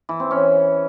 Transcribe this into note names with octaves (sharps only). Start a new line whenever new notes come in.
E3
C4
C#4